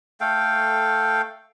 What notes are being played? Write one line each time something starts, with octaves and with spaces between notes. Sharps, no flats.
A3 A4 F5 G5